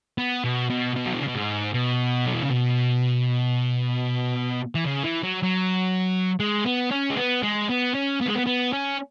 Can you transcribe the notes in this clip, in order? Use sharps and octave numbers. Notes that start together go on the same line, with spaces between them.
B3
B2
B2
B2
F#3
E3
C#3
B2
G#2
B2
F#3
E3
C#3
B2
E3
C#3
E3
F#3
F#3
G#3
B3
C#4
G#3
B3
G#3
B3
C#4
B3
G#3
B3
B3
C#4